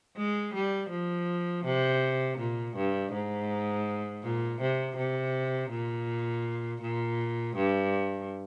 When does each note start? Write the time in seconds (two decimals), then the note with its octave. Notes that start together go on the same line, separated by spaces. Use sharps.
0.17 G#3
0.54 G3
0.90 F3
1.65 C3
2.38 A#2
2.76 G2
3.13 G#2
4.23 A#2
4.61 C3
4.97 C3
5.71 A#2
6.81 A#2
7.56 G2